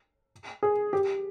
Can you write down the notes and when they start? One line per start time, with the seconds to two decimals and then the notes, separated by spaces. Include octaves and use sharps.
0.63 G#4
0.93 G4